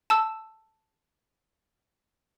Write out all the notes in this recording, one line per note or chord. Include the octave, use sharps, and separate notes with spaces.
A5 E6